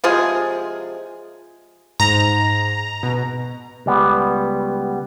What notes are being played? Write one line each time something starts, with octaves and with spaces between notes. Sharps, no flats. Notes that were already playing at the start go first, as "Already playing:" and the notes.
C3 F3 G#3 G#4
G#2 A#5
B2
C#2 G3 B3